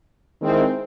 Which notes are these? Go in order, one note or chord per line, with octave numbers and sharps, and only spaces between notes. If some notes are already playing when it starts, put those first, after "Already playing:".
D#3 G#3 C4 E4